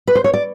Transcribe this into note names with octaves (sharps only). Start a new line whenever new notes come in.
B4
C5
C#5
D5